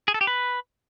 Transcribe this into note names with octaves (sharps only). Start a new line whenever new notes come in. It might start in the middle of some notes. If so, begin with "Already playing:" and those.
G#4
A4
G4
B4